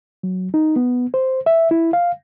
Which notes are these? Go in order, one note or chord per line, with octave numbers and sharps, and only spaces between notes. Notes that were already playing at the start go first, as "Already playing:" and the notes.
F#3
D#4
B3
C5
E5
E4
F5